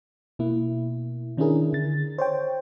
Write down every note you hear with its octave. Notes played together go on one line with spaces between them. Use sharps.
B2 A#3 E4
D#3 C#4 D4 E4 G#4 A#4
D3 A6
C5 C#5 G5